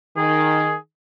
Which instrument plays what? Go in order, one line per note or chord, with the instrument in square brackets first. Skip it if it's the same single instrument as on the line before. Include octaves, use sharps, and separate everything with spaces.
[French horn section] D#3 [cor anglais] G#4